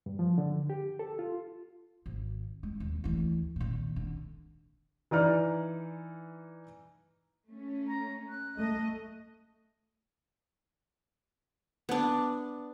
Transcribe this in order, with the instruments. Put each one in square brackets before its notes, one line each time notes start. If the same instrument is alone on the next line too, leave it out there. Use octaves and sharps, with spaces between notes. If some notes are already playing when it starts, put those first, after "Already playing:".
[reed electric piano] G2
F3
D3
G4
A4
F4
[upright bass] G#1
G#3
D#2
D2 E3
A#2 D#3
D3
[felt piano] E3 D#4 D5 F6
[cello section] A3 C#4
[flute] A#5
F#6
[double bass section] A3 [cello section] D#5
[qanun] B3 D4